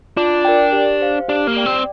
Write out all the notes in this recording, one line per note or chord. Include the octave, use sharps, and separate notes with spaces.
D4 F4
A#4 D5 G5
G4
C5 F5
D4 G4
A#3
D5 G5
C4